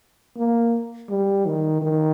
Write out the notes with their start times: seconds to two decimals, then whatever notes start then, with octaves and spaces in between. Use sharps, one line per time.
0.37 A#3
1.10 G3
1.46 D#3
1.82 D#3